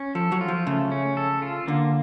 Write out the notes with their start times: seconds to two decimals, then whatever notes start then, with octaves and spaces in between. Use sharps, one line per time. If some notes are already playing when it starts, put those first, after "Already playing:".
Already playing: C#4
0.15 F3 A4
0.32 F#3
0.41 F4
0.48 F3
0.66 C#3 A3
0.92 C#4
1.17 A4
1.42 F4
1.68 D3 A#3